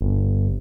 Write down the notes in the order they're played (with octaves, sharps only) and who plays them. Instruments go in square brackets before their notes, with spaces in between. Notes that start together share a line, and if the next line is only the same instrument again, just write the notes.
[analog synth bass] G1